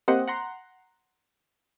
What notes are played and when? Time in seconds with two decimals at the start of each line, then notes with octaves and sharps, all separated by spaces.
0.08 A#3 C4 G4 C5 D#5 F#5
0.28 F#5 A#5 C6